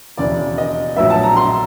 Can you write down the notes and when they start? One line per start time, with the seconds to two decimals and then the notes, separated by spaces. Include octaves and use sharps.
0.17 E1 D#2 C#3 E3 D5
0.58 D#5
0.96 A#1 A2 F#3 B3 E5
1.10 A5
1.23 A#5
1.36 C6